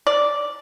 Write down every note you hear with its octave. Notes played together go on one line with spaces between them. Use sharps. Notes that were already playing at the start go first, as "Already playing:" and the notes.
D5